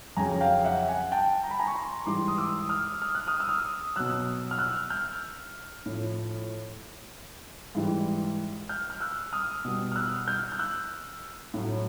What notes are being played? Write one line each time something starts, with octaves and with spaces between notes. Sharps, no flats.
F2 C#3 F#3 G#5 A#5
F5 G5
E5 F#5
F#5 G#5
G5 A5
A#5
B5
G#5 A#5
C#6
A#5 C6
G#2 E3 G3 C6 D6
D#6
D6 E6
D#6 F6
F6
F#6
D#6 F6
E6
D#6 F6
B2 F#3 E6 F#6
F6
E6 F#6
F6 G6
A2 F3
G#2 E3 G3
F6 G6
F6
E6 F#6
D#6 F6
B2 G3
F6
E6 F#6
F6 G6
G6
E6 F#6
A2 F#3